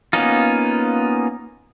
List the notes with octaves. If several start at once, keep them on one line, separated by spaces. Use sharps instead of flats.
A#3 B3 C#4 D#4 F4